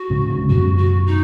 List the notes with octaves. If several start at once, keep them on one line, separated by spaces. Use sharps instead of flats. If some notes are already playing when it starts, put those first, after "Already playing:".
Already playing: F#4
G#2 C#3
G#2 C#3
C#3
F#2 B2 F#4
F#4
D#4